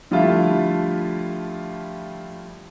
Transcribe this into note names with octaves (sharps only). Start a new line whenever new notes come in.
D3 F3 G3 A3 E4 F4